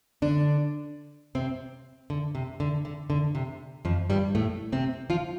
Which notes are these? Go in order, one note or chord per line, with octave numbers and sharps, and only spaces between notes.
D3 D4
C3 C4
D3
C3
D3
D3
D3
C3
F2 F3
G2 G3
A2 A3
C3 C4
F3 F4